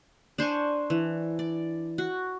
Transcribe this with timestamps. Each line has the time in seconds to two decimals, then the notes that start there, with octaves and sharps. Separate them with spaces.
0.38 D4 C5 G#5 C#6
0.90 E3
1.39 D5
1.98 F#4